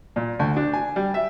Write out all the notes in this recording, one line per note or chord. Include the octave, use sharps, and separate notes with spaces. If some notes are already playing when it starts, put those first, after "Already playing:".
A#2
D2
D4
G#5
G3
E5